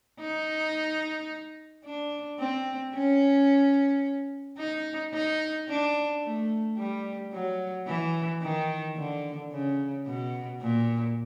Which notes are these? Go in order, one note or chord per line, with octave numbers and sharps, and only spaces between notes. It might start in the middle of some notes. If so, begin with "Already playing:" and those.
D#4
D4
C4
C#4
D#4
D#4
D4
A3
G3
F#3
E3
D#3
D3
C#3
B2
A#2